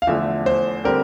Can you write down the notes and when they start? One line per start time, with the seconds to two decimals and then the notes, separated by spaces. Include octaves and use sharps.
0.02 F5
0.07 E2 D3 F3 A3 E5
0.46 C5
0.84 D3 G3 C4 G4 A#4